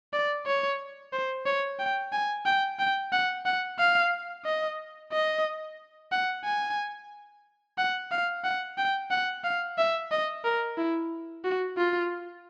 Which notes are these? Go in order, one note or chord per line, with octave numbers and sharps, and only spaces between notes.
D5
C#5
C5
C#5
G5
G#5
G5
G5
F#5
F#5
F5
D#5
D#5
F#5
G#5
F#5
F5
F#5
G5
F#5
F5
E5
D#5
A#4
E4
F#4
F4